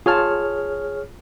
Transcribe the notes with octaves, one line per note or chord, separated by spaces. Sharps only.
F4 G#4 C#5 A5 F6